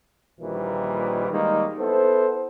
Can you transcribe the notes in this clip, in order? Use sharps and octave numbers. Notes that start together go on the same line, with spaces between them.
A#1 A#2 D#3 E3 G3
D#3 G3 G#3 A#3 D#4
B3 E4 A4 C5